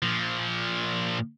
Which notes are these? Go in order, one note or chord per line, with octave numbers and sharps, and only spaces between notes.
A#2 F3